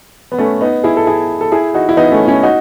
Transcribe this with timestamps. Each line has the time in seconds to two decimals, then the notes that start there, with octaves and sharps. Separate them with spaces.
0.32 B3
0.38 A3 C#4
0.61 B3 D#4
0.83 E4 G#4
0.97 A4
1.07 E4 G#4
1.41 A4
1.52 E4 G#4
1.74 D#4 F#4
1.89 E4
1.97 B3 D#4
2.12 A3 C#4
2.27 C#4 E4
2.43 D#4 F#4